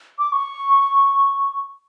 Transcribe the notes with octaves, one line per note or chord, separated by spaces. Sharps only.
D6
C#6